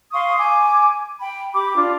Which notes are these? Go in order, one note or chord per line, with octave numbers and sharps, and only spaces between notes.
F5 C6 C#6 D#6
G#5 D6
G5 B5
G4 B5 D6
D4 F4